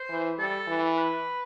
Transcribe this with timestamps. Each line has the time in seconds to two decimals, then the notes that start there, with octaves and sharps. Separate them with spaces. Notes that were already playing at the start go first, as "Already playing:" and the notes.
Already playing: C5
0.10 E3
0.39 G3 A4
0.68 E3
0.97 B4